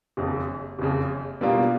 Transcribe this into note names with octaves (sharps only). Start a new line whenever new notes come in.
F#1 F2 C#3
F#1 F2 C#3
B2 G3 A#3 D4 F4